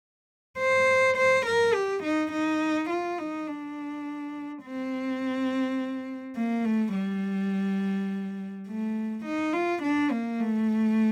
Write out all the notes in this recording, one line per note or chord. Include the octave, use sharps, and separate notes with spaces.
C5
C5
A#4
G4
D#4
D#4
F4
D#4
D4
C4
A#3
A3
G3
A3
D#4
F4
D4
A#3
A3